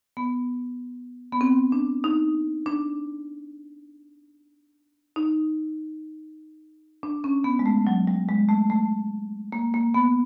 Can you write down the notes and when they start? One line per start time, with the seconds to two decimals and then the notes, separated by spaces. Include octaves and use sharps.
0.17 B3
1.32 B3
1.41 C4
1.72 D4
2.04 D#4
2.66 D4
5.16 D#4
7.03 D4
7.24 C#4
7.44 B3
7.59 G#3
7.66 A3
7.87 F#3
8.07 G3
8.29 G#3
8.49 A3
8.70 A3
9.53 A#3
9.74 A#3
9.94 B3